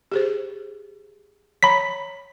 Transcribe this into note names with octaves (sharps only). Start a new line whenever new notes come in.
G4 G#4 C5
C#5 A#5 B5 B6